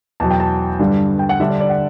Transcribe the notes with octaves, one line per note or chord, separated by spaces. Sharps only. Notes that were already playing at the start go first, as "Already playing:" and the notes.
E2 B2 F#3 A5
G5
A5
G2 D3 G3
G5
F#5
D3 G3 D4 E5
D5
D5
F#5